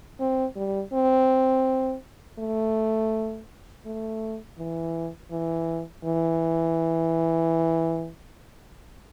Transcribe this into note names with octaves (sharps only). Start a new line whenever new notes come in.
C4
G3
C4
A3
A3
E3
E3
E3